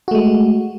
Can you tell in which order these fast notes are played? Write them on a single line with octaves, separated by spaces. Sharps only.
F#4 A3 G#3